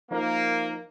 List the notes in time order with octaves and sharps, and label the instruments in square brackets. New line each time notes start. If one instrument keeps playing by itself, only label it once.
[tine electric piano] F3 D#4 A#4 [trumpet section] A#3